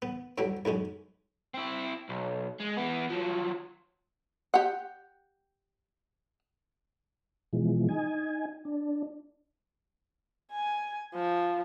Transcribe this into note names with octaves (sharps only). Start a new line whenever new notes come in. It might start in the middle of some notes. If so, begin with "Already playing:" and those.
B3
D2 D3 F#3 G3
B1 F#2 G#3 C#4
C4 E4
B1
G#3
E3 B3
F3 F#3
G4 F#5
B2 E3 F3 G#3
D#4 G#5
D4
G#5
F3